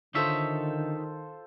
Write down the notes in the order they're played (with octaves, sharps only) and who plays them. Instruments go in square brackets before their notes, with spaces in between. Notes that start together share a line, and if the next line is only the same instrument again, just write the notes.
[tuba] D3 [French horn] D#3 [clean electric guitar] D#4 C#5 E5 [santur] F4 A4 C5